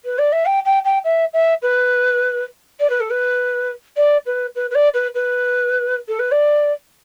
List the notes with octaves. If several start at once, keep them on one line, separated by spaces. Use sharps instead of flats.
B4
D5
E5
G5
G5
G5
E5
E5
B4
D5
B4
A4
B4
D5
B4
B4
B4
D5
B4
B4
A4
B4
D5